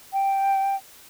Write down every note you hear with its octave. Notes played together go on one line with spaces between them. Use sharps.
G5